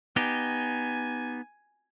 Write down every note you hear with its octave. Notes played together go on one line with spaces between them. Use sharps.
B3 D#4 G4 G#5